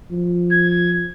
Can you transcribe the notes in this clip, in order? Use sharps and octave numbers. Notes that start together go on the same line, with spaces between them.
F3
G#6